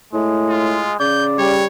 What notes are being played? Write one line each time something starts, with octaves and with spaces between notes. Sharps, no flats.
A2 G#3
F4
C#3 D5 G6
G3 C#5